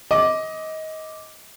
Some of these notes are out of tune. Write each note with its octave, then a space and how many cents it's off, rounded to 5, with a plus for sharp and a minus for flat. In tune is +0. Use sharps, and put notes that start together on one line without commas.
D#5 +20 D6 +0